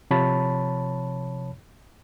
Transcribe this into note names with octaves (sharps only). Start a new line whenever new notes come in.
C3 F3 C#5 A5 B5